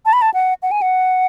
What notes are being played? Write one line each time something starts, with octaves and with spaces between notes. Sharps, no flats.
A5
B5
A5
F#5
F#5
G#5
F#5